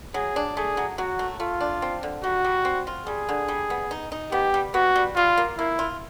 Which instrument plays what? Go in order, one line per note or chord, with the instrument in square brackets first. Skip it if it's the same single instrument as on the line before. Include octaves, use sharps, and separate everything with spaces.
[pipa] F#3 [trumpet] G#4
[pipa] D4
[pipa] A3 [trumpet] G#4
[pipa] F#3
[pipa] F#3 [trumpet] F#4
[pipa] A3
[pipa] A3 [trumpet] F4
[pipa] D4
C4
D3
[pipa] G3 [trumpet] F#4
[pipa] G3
C4
F4
[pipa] G3 [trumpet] G#4
[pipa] D3
G3
B3
D#4
D#4
[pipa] B3 [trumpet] G4
[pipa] G3
[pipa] B3 [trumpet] F#4
[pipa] G3
[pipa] G3 [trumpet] F4
[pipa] A#3
[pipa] A#3 [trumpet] E4
[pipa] F4